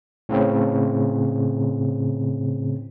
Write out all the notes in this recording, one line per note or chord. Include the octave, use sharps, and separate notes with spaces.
A2 C#3 C4